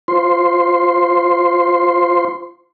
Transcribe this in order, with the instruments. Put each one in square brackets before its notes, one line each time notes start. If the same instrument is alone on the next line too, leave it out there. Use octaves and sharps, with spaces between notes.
[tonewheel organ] F4 C5 C6